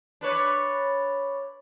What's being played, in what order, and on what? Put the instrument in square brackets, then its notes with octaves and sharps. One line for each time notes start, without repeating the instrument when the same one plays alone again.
[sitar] D4 B4 C#5